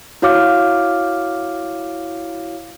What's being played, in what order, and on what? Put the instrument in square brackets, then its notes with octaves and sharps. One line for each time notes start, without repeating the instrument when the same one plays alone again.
[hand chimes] E4 F#4 C#5 F5 D6 F6